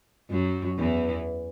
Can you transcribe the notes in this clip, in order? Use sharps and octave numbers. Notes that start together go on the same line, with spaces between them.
F#2 F#3
E2 E3